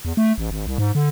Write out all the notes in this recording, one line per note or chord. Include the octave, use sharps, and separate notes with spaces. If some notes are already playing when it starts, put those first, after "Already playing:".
E2
A3
A1
G#1
C2
G#2
D3